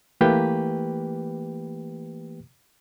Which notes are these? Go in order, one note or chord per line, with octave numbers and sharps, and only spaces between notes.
E3 A3 A#3 G4 B4 G5